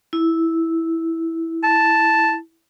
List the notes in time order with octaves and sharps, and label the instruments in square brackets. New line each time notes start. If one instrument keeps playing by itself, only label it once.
[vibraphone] E4
[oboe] A5